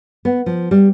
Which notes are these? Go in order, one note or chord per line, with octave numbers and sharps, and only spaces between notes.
B3
F3
G3